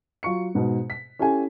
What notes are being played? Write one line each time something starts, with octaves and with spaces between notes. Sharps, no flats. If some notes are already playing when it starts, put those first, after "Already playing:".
F#3 F4 C#6 C#7
G#2 B2
B6
C#4 E4 G4 A4 G#5